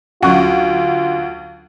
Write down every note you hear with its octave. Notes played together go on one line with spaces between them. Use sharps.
D2 F#3 C#4 F4 F#4 F5